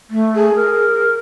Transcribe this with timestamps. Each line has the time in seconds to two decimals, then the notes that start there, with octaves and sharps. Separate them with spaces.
0.10 A3
0.36 G#4
0.55 A#4